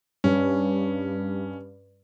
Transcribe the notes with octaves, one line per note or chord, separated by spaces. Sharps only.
G2 C#4